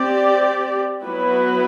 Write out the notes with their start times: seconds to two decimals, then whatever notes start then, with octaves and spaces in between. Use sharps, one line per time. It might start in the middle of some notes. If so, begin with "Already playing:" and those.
Already playing: C4 G4 D5
1.03 F#3 B3 E4 B4